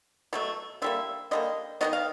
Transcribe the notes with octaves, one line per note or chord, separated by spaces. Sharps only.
B2 F#3 A3
D3 G3 A#3 E5
D3 G3 A#3 D#5
D#3 G#3 B3 D#5
F5